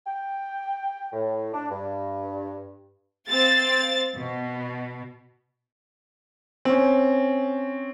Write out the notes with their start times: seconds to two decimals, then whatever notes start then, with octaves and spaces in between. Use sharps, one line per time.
0.07 G5
1.13 A2
1.54 D4
1.71 G2
3.28 C4 F5 A6
4.15 B2
6.65 C4 C#4